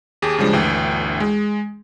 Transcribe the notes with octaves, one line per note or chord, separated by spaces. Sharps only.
D#2 G4 G#4
C#3 F3 G3 G#3 D4
G1 D2 E3 G5
G#3